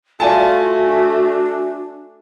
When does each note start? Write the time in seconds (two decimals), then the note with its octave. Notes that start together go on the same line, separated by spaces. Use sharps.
0.20 A3 F4 F#4 D5 G#5 A5
0.85 D4